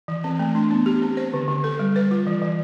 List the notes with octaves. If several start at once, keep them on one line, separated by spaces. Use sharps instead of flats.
E3
C4
A3
D4
B3
G4
C4
C5
D3
D3
A4
G3
B4
F4
E3
E3